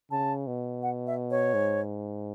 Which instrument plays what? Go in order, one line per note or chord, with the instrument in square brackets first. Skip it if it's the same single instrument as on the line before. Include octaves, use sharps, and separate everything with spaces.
[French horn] C#3 [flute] A5
[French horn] B2
[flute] F#5
E5
C#5
[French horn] G#2